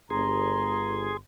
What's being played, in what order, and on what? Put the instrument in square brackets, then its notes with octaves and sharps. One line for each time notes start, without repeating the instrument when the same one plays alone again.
[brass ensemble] G1 [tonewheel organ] G#4 [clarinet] A#5 [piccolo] C6